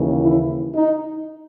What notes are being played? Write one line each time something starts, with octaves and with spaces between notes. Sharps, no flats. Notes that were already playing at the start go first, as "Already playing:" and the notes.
Already playing: D#2 C#3 E3
E4
D#4